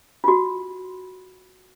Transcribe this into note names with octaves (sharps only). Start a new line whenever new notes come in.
F4 F#4